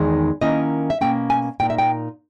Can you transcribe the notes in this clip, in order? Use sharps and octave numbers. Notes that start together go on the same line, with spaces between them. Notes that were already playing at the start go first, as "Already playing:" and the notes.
Already playing: E2 D#3 G#3 D#4
D#3 A#3 C#4 E4 D#5
E5
B2 A#3 C#4 G5
G#5
A#2 A#3 D#4 G5
E5
G5